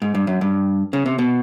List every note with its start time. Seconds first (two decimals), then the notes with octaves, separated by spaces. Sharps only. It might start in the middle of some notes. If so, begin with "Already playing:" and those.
0.02 G#2
0.15 G2
0.27 F#2
0.41 G2
0.93 C#3
1.06 C3
1.18 B2